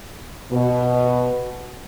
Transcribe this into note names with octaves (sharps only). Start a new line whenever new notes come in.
B2